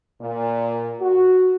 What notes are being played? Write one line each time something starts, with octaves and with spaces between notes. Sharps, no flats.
A#2
F#4